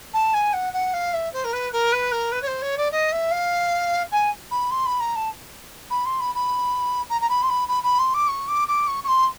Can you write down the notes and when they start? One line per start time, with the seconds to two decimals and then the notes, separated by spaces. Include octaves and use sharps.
0.13 A5
0.34 G#5
0.53 F#5
0.73 F#5
0.93 F5
1.13 E5
1.33 C5
1.44 A#4
1.53 B4
1.72 A#4
1.92 B4
2.11 A#4
2.32 B4
2.42 C#5
2.47 C5
2.62 C#5
2.77 D5
2.91 D#5
3.12 E5
3.31 F5
4.11 G#5
4.51 B5
4.71 C6
4.86 B5
5.00 A#5
5.15 A5
5.90 B5
6.05 C6
6.20 B5
6.35 B5
7.09 A#5
7.21 A#5
7.29 B5
7.42 C6
7.49 B5
7.68 B5
7.83 B5
7.98 C6
8.14 D6
8.28 C#6
8.48 D6
8.68 D6
8.87 C#6
9.04 C#6
9.08 C6